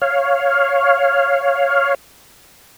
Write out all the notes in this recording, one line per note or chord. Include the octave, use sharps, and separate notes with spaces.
C#5 F5